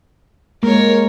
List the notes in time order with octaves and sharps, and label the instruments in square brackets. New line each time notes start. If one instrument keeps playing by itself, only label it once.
[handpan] G#3 A#3 [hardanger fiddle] A#4 C#5